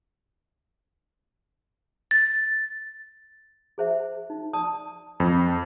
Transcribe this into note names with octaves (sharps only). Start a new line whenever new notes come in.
A6
G#4 C5 E5
D#4
D5 A5 D#6
F2